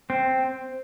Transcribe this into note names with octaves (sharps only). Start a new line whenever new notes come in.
C4